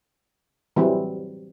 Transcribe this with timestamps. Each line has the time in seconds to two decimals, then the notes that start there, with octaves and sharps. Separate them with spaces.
0.76 E3 F#3 G3 C4